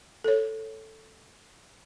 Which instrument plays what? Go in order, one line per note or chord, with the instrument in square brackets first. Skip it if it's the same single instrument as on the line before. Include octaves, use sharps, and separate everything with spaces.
[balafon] A4 C#5